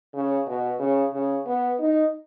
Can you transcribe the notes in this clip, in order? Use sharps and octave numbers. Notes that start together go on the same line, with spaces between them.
C#3
B2
C#3
C#3
B3
D#4